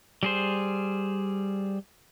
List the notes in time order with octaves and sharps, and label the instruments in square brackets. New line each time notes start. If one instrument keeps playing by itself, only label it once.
[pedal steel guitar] G3 G#4 C5